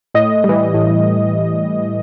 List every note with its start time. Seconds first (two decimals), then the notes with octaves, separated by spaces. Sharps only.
0.15 A2 D#5
0.44 E3 G3
0.74 A2